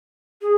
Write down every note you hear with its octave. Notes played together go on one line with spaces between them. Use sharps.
G#4